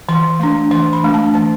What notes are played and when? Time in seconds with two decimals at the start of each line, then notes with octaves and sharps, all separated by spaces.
0.09 E3 C6
0.39 A3 D4 C6
0.71 E3 C6
0.93 B5
1.03 A3 D4
1.14 A5
1.34 E3 A5